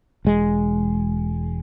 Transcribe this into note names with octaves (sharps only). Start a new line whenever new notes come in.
E1 G#3